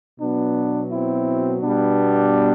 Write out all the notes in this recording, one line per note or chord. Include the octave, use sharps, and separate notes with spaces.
B2 F#3 B3 D4
C4 E4
B2 G3 B3 D4